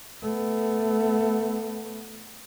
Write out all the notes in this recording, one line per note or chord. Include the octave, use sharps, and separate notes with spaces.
A3 B3